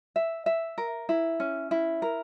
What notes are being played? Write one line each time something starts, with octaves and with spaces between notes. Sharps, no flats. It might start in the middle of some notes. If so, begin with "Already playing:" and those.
E5
E5
A#4
E4
C#4
E4
A#4